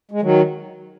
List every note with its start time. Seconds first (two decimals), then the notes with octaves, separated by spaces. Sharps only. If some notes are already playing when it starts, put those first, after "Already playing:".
0.11 G#3
0.22 D#3 F#3